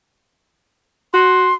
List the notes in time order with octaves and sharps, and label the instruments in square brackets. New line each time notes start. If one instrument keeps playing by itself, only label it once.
[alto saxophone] F#4 [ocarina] C6